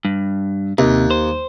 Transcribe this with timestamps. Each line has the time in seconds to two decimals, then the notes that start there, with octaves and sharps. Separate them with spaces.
0.05 G2
0.78 D#2 C3
1.11 C5